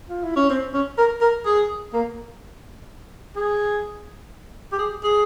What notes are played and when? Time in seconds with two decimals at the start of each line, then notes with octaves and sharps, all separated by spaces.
0.09 F4
0.23 E4
0.36 C#4
0.50 C4
0.73 C#4
0.98 A#4
1.21 A#4
1.45 G#4
1.94 A#3
3.36 G#4
4.72 G4
4.79 G#4
5.03 G#4